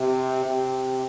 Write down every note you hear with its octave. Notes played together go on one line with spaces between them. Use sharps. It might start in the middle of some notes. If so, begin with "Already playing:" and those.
Already playing: C3
C3